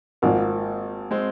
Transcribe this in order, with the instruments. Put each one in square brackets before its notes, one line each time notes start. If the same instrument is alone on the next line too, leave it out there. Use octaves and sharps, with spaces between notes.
[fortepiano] G#1 G#2 F3 [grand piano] A#3
[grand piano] G#3 C4